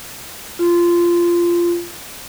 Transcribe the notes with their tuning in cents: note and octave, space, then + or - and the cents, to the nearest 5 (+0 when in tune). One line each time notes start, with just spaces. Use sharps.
F4 -15